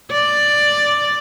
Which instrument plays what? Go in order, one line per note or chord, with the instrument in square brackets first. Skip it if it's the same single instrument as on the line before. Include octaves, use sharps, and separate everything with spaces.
[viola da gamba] D5